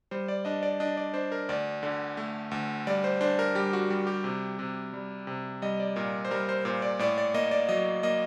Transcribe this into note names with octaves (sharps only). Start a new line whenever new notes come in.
G3 C5
D5
D4 D#5
D5
D4 D#5
D5
D4 C5
A#4
D2 D5
D3
A3
D2
G3 D5
C5
D4 C5
A#4
G3 G4
F#4
G3
G4
C3
C3
G3
C3
G3 D#5
D5
A#2 A#4
C5
G3 A#4
C5
A#2 C5
D5
A2 D5
D5
A#3 D#5
D5
F#3 D#5
A#3 D#5